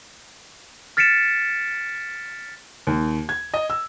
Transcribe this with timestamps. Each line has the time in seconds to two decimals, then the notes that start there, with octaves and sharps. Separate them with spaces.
0.97 F6 A6 B6 C#7 D7 E7
2.87 D#2
3.29 G#6
3.54 D#5
3.70 E6